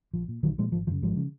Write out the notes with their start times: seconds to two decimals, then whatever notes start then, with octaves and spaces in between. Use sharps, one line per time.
0.13 A#1 F3
0.28 A#2
0.43 A#1 D#3 F#3
0.58 A#2 F3 G#3
0.72 G#1 F3
0.87 F#2 C#3 F3
1.02 G#1 F3 G#3
1.17 C#3